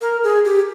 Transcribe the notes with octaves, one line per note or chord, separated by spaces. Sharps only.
A#4
G#4
G4